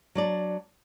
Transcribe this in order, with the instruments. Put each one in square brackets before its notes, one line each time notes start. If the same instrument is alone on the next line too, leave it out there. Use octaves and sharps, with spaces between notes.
[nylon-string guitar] F#3 D4 D5